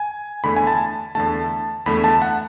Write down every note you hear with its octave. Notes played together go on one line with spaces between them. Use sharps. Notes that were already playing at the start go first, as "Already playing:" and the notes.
Already playing: G#5
E2 D3 A3 B5
G#5
A5
E2 D3 A3 A5
E2 D3 A3 B5
A5
F#5